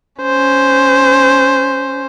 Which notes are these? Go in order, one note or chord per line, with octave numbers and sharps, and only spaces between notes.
C#4 C5